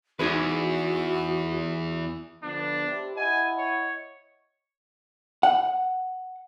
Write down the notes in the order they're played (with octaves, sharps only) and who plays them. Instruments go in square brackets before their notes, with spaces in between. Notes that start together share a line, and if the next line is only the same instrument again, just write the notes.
[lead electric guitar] E2 [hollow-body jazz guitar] D#4 G#4 B4 [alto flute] F#4
[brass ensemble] D3 F3 B3 [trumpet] D4
[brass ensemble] E4 G4 C5
[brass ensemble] E4 D#5 F#5 [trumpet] G#5
[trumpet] C#5
[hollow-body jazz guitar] F#5